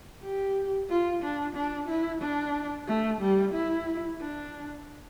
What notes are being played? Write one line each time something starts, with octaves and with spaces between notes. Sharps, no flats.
G4
F4
D4
D4
E4
D4
A3
G3
E4
D4